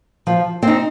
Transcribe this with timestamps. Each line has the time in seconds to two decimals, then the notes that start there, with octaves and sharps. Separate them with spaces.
0.27 F3
0.63 C4 D#4